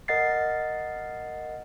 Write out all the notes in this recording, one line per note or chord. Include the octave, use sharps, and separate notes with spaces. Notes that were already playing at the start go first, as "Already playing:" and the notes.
A#4 D#5 F#5 A6 C7